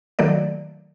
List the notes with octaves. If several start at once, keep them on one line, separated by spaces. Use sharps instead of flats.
D#3 F#3 A3 A#3 D5